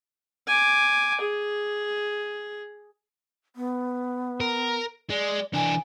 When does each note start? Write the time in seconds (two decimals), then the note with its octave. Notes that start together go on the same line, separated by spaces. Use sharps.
0.47 G#5 D6
1.21 G#4
3.56 B3
4.40 A#4
5.10 G#3 D5
5.54 E3 D4 G#5